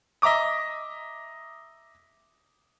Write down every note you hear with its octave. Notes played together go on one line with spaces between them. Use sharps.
D#5 E5 A#5 D6 D#6